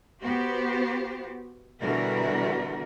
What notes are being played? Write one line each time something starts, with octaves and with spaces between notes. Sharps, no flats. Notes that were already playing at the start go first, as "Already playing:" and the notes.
B3 F#4 G4 C5
B2 D3 E3 G3 F#4 A#4